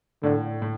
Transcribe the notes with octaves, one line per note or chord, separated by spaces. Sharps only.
A2 D3
A2